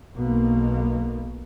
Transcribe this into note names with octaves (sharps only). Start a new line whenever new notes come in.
B1 B2 A#3